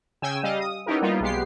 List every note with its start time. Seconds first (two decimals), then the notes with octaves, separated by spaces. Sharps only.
0.22 C#3 G5 G#5 E6
0.43 G3 D#5 F5
0.60 D#6
0.86 B3 C#4 D#4 E4 G4 A#4
1.02 G3 A#3 B3 D#4 F4
1.20 B1 G#3 B3 G4 C7